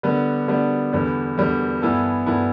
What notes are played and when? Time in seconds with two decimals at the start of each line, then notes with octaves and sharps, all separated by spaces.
0.03 D3 G3 B3 D4
0.48 D3 G3 B3 D4
0.93 E2 D3 G3 B3
1.38 E2 D3 G3 B3
1.82 G2 E3 B3 E4 A4
2.26 G2 E3 B3 E4 A4